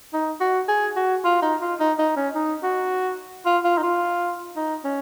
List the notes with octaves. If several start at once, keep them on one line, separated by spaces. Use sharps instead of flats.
D#4
F#4
G#4
F#4
F4
D#4
F4
D#4
D#4
C#4
D#4
F#4
F4
F4
D#4
F4
D#4
C#4